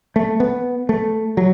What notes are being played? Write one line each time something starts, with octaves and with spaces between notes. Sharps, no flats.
A3
B3
A3
F#3